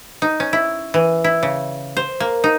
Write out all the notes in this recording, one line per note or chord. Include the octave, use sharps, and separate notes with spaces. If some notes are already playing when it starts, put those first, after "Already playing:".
D#4
C#4
E4
E3
E4
C#3
C5
A#3
D#4